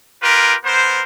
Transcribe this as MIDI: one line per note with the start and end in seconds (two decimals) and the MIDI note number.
0.22 0.55 65
0.22 0.55 67
0.22 0.55 70
0.22 0.55 71
0.64 1.03 59
0.64 1.03 70
0.64 1.03 72